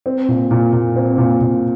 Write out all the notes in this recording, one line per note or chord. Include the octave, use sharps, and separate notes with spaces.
C4
A#2
A#2
A#2
C4
A#2
A#2